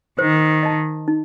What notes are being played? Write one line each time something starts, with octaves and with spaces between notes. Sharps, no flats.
D#3 C5
D#5 A5
D#4